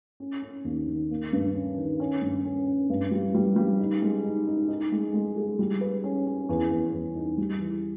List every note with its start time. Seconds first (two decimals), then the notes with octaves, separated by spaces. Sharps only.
0.20 C#4
0.42 C#4
0.65 D#2
0.87 D#3
1.11 A#3
1.33 G2
1.55 C#4
1.77 D#3
2.00 C#4
2.22 G2
2.44 C#4
2.66 C#4
2.90 G2
3.11 G3
3.34 G3
3.56 G3
3.79 D#4
4.02 G#3
4.24 D#4
4.47 D#4
4.68 D#4
4.92 G#3
5.14 G#3
5.36 G#4
5.59 G3
5.81 B4
6.04 C#4
6.27 C#4
6.49 E2
6.70 E2
6.93 E2
7.16 D#4
7.38 G3
7.60 E3